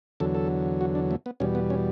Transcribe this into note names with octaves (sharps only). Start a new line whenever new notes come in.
E2 D3 F#3 A4
A4
F#4
D4
A3
B3
E2 B2 G3 C#4
B3
C#4